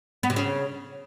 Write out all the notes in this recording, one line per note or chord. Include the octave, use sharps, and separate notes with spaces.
B3
C3
C#3